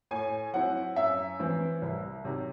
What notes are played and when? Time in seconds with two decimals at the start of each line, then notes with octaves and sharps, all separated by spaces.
0.11 A2 G#5
0.54 F#3 C4 E4 F#5
0.96 F#2 E5
1.39 E3 C4 E4
1.82 C2
2.25 C3 D#3 F#3